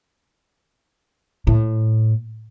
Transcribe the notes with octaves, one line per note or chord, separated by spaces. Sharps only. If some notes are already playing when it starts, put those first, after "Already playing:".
A2